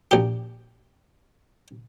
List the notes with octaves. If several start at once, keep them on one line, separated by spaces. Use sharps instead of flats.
A#1 G4